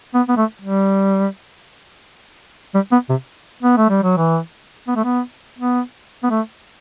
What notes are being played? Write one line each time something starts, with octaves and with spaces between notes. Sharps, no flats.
B3
B3
A3
G3
G3
B3
C3
B3
A3
G3
F#3
E3
B3
A3
B3
B3
B3
A3